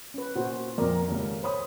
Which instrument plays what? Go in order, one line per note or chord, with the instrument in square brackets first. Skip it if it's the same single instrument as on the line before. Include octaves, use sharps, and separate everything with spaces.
[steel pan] C#4 B4
[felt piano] A#2 [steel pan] F#4 C5
[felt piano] F2 A#2 [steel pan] A#4 D5
[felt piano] D#1 C#2
[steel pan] C5 [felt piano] C#5 B5 D#6